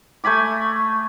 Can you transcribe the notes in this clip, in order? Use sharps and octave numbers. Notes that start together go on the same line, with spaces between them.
A3 G#5 B5 D6